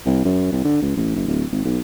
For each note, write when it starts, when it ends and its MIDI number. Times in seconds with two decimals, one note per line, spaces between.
0.06 0.21 36
0.25 0.49 42
0.52 0.64 36
0.65 0.80 50
0.82 0.97 37
0.97 1.16 33
1.16 1.25 30
1.28 1.44 26
1.52 1.64 32
1.65 1.79 35